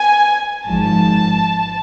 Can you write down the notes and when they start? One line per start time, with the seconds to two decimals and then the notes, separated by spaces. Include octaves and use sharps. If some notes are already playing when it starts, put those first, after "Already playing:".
Already playing: G#5
0.65 G#1 G#2 F3 A5